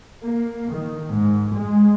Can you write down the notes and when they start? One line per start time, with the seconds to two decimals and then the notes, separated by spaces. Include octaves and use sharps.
0.23 A#3
0.71 D#3
1.09 G#2
1.54 G#3